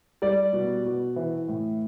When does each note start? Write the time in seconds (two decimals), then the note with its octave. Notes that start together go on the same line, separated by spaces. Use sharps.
0.22 G3 D5
0.53 B2
0.86 B2
1.16 E3
1.48 A2